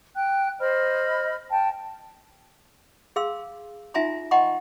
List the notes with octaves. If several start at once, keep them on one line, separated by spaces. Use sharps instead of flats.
G5 F#6
C5 D#5 B5 F6
G5 A5
G#4 F5 C6 E6
D#4 F4 E5 G#5 A#5 C6
D#5 F#5 G5 A#5 C6 C#6